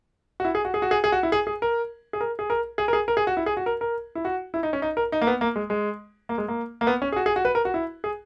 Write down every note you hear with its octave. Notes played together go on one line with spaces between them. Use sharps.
F#4
E4
G#4
F#4
G#4
F#4
G#4
G#4
F#4
E4
G#4
G#4
A#4
G#4
A#4
G#4
A#4
G#4
A#4
G#4
A#4
G#4
F#4
E4
G#4
F#4
A#4
A#4
E4
F#4
E4
D#4
C#4
D#4
A#4
D#4
A#3
B3
A#3
G#3
G#3
A#3
G#3
A#3
A#3
B3
C#4
G#4
F#4
G#4
F#4
B4
A#4
F#4
E4
G#4